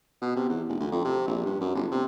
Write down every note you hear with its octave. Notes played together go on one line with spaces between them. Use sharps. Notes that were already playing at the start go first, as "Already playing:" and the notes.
B2
C3
E2
F1
D2
F2
C3
A#1
G2
F#2
G1
C3